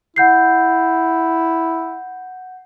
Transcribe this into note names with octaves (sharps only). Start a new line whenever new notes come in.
E4 F#5 G6 C7